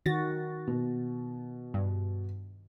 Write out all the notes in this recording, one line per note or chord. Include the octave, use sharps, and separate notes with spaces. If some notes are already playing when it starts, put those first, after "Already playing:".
D#3 F#4 A6 A#6
B2
G2